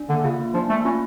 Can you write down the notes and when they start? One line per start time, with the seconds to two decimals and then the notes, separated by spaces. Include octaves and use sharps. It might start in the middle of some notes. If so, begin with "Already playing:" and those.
Already playing: D4
0.09 D3 A#3
0.24 C#3 F4
0.39 A#3
0.54 F3 D4
0.70 A3 A#3
0.85 C#4 F4